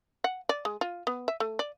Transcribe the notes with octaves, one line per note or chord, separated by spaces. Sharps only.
F#5
D5
G#3
F4
B3
E5
A3
D5